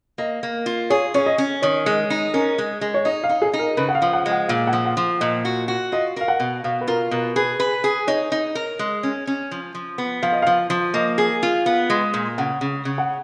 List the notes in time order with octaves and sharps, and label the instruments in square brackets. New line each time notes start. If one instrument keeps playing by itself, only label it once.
[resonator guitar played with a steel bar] A#3 [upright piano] D#5
[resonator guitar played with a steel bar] A#3
F4
[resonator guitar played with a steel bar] G#4 [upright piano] C#5
[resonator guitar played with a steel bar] C#4 [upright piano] C#5
[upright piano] D#5
[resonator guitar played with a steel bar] C#4
[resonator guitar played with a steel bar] D#3 [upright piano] C#5
[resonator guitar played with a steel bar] G#3
D#4
[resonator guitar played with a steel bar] C#4 [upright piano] A#4
[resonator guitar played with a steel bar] G#3
G#3
[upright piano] C#5
[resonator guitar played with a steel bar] D#4 [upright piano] D#5
[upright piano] F5
[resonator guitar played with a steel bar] D#4
[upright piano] G#4
[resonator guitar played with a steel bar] D#4
[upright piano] A#4
[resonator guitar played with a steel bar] C#3 [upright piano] B4
[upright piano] F#5
F5
[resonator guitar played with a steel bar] F3
[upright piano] F#5
[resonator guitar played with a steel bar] G#3
[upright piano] F#5
[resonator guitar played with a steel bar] A#2 [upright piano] F5
[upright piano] F#5
[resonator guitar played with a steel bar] F3
[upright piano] F#5
[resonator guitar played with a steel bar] F3
[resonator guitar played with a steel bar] A#2 [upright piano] D#5
[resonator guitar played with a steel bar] F#4
F#4
[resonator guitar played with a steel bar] F4 [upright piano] D#5
[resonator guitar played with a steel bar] A#4 [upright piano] F5
[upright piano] F#5
[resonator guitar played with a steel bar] B2
[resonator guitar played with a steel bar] B2 [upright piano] F5
[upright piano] B4
[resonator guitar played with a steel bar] F4 [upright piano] A#4
[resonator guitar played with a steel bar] B2 [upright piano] A#4
[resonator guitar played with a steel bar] G#4 [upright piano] B4
[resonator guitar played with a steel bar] B4
G#4
[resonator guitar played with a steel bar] D#4 [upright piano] C#5
[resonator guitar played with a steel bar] D#4
A#4
G#3
C#4
C#4
F3
F3
B3
[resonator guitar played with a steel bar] F3 [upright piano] F5
[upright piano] D#5
[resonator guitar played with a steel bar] F3 [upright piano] F5
[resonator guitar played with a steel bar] F3
[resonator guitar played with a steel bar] A#3 [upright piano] D#5
[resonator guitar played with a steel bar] G#4
F4
[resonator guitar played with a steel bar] B3 [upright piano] F5
[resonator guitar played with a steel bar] G#3
A#2
[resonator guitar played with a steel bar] C#3 [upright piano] F#5
[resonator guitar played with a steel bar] C#3
C#3
[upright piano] F#5